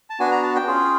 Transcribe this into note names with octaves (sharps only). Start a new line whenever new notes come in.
A5
B3 D4 F#4 G#5
A#5
A5
G5
C#4 F4 G#4